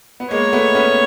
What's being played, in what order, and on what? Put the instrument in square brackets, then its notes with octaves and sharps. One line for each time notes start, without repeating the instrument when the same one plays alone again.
[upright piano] B3
[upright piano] G#3 A#3 [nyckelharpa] C#5
[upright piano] A3 B3
B3 C#4